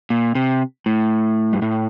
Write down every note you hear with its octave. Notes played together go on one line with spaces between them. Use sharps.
A#2
C3
A2
G2
A2